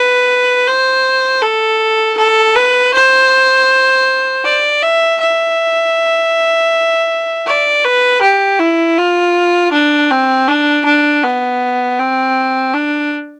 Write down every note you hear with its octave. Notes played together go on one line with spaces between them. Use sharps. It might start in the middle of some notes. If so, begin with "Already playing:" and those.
Already playing: B4
C5
A4
A4
B4
C5
D5
E5
E5
D5
B4
G4
E4
F4
D4
C4
D4
D4
B3
C4
D4